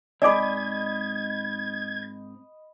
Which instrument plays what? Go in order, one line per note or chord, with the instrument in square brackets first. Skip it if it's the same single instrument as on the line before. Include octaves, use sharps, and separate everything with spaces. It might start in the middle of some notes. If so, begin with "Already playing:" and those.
[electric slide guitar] G#2 C4 [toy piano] D5 G#5 D6 [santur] D#5 B5 [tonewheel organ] G#6